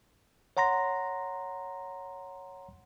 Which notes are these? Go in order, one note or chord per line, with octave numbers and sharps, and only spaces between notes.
C#5 F#5 A#5 C6 A#6